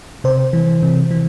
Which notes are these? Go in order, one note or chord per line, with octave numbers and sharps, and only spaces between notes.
C3 C5
E3
C3
E3